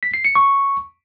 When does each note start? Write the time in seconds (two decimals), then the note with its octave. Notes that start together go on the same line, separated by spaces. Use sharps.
0.03 B6
0.14 C7
0.25 C#7
0.35 C#6